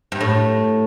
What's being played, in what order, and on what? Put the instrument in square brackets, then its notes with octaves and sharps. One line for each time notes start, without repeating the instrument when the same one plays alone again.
[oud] G2
A2